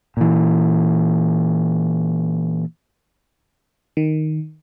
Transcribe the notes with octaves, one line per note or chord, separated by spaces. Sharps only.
A#2 E3
D#3